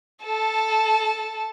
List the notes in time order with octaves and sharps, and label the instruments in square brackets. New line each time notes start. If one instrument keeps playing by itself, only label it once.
[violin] A4 A5